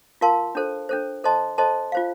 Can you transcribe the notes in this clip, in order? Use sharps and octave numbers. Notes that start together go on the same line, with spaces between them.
F4 A#4 F5 A5 C6
D4 A4 C5
D4 A4 C5
A4 C5 D#5 A5 C6
A4 C5 D#5 A5 C6
F4 C5 F5